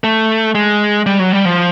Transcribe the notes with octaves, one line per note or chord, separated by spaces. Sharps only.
A3
G#3
G3
F#3
G3
F3